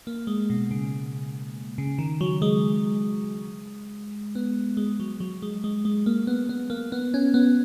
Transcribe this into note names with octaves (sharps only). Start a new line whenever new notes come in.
A#3
G#3
B2
C#3
C#3
D#3
F#3
G#3
B3
G#3
F#3
F#3
G#3
G#3
G#3
A#3
B3
B3
A#3
B3
C#4
B3